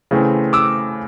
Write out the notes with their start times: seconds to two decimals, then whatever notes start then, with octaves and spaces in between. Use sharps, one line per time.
0.11 C#3 E3 A3 C4
0.53 D6 E6